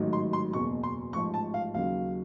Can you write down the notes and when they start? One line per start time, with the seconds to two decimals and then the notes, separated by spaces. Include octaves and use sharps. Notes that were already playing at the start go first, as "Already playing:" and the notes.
Already playing: A1 G#2 D#3 F#3
0.13 C6
0.33 C6
0.53 F#1 E2 B2 C#6
0.83 C6
1.13 A1 G#2 F3 C#6
1.34 A5
1.54 F5
1.74 D#2 C#3 F#3 F5